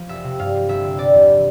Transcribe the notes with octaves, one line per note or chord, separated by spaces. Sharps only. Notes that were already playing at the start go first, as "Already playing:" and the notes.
Already playing: F3
F1 E5
C3
G2 F5
F3
G1 E5
D3
C3 D5
E2